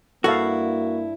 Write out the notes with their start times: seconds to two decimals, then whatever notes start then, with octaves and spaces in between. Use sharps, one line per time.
0.24 G2 A#3 E4 F#4 A4 F5